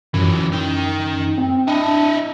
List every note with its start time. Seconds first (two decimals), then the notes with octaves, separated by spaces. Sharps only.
0.14 F#2 E3 F#3
0.52 D#4 G5
1.38 C4
1.68 D4 E4 D#5